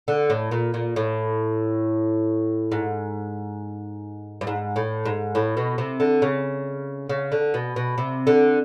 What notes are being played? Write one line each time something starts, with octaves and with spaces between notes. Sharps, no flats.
D3
A2
A#2
A#2
A2
G#2
G2
G#2
A2
G#2
A2
B2
C3
D3
C#3
C#3
D3
B2
B2
C3
D3